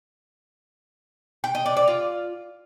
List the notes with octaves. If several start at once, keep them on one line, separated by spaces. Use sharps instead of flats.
G5
D#5
D4
D5
F4